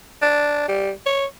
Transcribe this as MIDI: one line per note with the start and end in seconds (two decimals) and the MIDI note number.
0.22 0.67 62
0.68 0.91 55
1.06 1.26 73